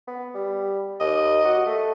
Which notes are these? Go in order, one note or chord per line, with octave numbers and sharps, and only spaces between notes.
B3
G3
D#2 D#5
F#4
A3